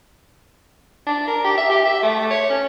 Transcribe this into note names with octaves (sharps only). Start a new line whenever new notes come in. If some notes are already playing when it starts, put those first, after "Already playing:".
D4
A#4
G4
E5
G4
E5
A3
C#5
C#4